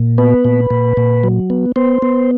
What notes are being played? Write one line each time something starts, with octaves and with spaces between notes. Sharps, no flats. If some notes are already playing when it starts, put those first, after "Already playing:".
Already playing: A#2
B3 B4
A#2
A#2
A#2
F#3
B3
B3 C5
B3